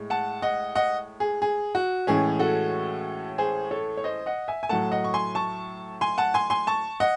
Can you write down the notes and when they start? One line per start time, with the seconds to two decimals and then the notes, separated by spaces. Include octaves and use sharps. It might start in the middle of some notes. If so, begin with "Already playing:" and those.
Already playing: A2 G#3
0.10 F#5 A5
0.42 D#5 F#5
0.75 D#5 F#5
1.20 G#4
1.42 G#4
1.75 F#4
2.07 A2 E3 G#3 C#4 G#4
2.39 F#4 A4
3.38 G#4 C5
3.71 A4 C#5
3.97 C#5
4.04 C5 D#5
4.26 D#5 F#5
4.48 E5 G#5
4.63 G#5
4.69 A2 F#3 A3 F#5 A5
4.92 D#5 F#5
5.04 C#6
5.14 G#5 C6
5.35 A5 C#6
6.01 G#5 C6
6.18 F#5 A5
6.34 G#5 C6
6.50 G#5 C6
6.67 A5 C#6
7.00 D#5 F#5